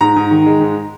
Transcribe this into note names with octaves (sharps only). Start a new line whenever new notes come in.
G#2 A#5
G#2
D#3
G#3
G#2